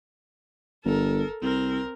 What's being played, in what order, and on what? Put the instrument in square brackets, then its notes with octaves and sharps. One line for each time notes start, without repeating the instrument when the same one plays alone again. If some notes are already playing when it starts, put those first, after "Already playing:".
[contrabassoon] G1 [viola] A4 A#4
[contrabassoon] C2 [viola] C4 A#4